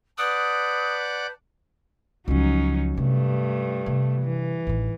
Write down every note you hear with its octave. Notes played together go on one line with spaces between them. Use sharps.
B4 D5 F#5 A5 D6 D#6 G6
C#2 F3 F#3 C#4 D#4
G2 C3 A3
C3
E3
A1 D#3